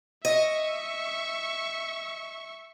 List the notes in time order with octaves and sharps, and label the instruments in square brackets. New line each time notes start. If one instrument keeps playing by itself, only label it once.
[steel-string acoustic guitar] D#5 [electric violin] E5 C#6